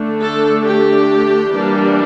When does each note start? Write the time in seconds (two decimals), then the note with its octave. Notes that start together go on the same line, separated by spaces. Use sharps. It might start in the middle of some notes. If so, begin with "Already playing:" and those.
Already playing: D3 A3 D4
0.20 A4
0.64 G4
1.50 E3 G3 A#3 D4